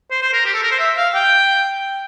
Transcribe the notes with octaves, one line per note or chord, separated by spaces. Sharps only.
C5
C5
A#4
G4
A4
A#4
C5
E5
F5
G5